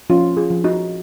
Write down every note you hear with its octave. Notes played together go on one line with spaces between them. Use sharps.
F3 C#4 F4
F4 G#4
F3
D#4 F#4